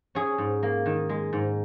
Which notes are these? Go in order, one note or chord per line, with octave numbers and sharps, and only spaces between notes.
C#4 G#4
G#2
A#3
D#3
G#3
G#2